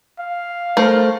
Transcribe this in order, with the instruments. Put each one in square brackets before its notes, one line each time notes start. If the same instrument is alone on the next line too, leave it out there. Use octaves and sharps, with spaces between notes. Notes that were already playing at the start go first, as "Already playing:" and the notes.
[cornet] F5
[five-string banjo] A3 A#4 C5